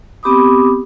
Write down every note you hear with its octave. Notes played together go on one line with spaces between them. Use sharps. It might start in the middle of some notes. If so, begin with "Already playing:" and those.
B3 C4 G4 B5 D6 D#6